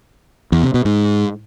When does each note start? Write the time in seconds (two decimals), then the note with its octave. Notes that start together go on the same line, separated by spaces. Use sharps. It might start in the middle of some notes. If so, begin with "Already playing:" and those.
0.52 E2
0.63 C3
0.74 B2
0.85 G#2